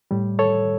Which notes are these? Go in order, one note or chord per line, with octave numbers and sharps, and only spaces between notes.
A2 G3
A4 C#5